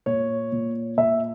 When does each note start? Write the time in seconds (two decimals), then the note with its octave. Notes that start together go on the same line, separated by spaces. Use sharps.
0.06 A#2 C#5
0.52 A#2
0.97 A#2 E5